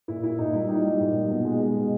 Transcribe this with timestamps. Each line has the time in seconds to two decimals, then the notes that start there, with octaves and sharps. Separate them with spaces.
0.08 A#2 E4
0.23 A#2 E4
0.39 A#2 D#4
0.53 G3 E4
0.69 G3 D#4
0.85 G3
1.00 A#2
1.15 G3
1.29 B2
1.45 G#3
1.60 G#3
1.75 B2